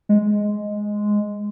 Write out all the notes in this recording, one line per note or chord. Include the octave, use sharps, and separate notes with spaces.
G#3